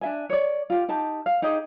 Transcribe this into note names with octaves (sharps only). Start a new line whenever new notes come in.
D4 E5 G#5
C#5 D5
F4 G4
D#4 G4 A5
F5
D#4 G4 G#4 D#5